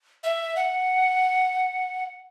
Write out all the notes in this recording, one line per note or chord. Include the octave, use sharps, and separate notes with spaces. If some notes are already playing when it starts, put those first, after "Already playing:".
E5
F#5